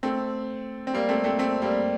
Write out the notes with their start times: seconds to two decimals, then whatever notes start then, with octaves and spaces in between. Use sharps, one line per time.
0.03 A3 C4
0.87 C4
0.94 G3 A#3
1.09 A3 C4
1.24 A3 C4
1.39 A3 C4
1.62 G3 A#3